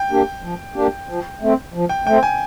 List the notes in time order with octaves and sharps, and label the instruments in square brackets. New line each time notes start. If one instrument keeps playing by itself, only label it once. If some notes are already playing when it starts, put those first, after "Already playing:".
Already playing: [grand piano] G5
[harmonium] A#3 D4 G4
F3
A#3 D4 G4
F3
A3 C4
F3
[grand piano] G5
[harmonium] A3 C4 [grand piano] G5
[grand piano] G#5